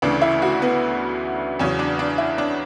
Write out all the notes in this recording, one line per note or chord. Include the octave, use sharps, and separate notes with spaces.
D2 C#3 E3 D4
E4
F#4
B3
E2 C#3 F#3 C#4
D4
D4
E4
D4